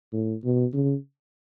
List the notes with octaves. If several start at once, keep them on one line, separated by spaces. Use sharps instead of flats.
A2
B2
C#3